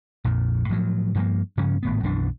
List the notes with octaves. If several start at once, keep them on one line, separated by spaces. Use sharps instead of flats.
A#1 F2 A#2
A2 F3 F#3
G2 F3 A#3
G2 C#3 F3 C#4
G#1 A2 B3
B1 F#2 E3 D4